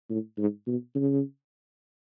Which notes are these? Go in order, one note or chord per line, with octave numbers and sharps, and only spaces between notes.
A2
G#2
B2
C#3